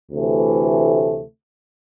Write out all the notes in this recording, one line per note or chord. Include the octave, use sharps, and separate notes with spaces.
D2 C3 E3 A3